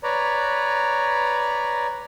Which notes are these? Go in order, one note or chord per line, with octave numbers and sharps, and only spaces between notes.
B4 C#5 D5 A#5